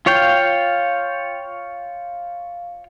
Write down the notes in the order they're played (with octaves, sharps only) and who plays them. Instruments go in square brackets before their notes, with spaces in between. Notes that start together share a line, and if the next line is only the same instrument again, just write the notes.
[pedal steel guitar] F4 C#5 F5 G5